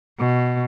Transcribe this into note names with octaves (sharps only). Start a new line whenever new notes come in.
B2